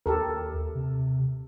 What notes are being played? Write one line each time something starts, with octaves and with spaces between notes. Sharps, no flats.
D#2 G4 A4 A#4
C3